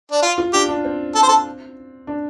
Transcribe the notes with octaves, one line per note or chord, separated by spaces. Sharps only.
D4
F4
F4
D4 G4
D4
C4
A4
C5
A4
D4